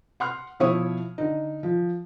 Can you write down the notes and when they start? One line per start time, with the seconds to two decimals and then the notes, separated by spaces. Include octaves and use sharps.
0.20 F#5 C6 F6
0.60 B2 F3 E4 C#5 E5 D#6
1.18 D3 D#4
1.63 F3